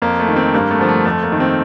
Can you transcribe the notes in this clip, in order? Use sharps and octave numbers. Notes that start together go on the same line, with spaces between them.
F2 A#3
A3
D#3
C4
G2 A#3
A3
D3 F3
A3
F2 A3
A#3
D#3
C4